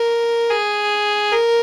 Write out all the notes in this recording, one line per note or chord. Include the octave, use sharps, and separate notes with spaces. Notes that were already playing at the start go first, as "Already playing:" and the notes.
Already playing: A#4
G#4
A#4